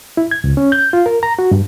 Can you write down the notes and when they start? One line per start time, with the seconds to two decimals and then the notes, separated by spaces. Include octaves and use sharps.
0.17 E4
0.31 G#6
0.44 C#2
0.57 C#4
0.72 G6
0.93 F4
1.06 A#4
1.23 A#5
1.39 F#4
1.51 G2